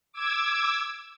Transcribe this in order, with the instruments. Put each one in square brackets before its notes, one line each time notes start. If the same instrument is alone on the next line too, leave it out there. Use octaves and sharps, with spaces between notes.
[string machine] D6 E6 G#6